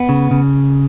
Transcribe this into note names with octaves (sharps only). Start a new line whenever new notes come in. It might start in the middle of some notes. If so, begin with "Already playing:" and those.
Already playing: B3
C#3
C#3